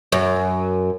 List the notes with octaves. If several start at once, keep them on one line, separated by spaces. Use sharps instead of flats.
F#2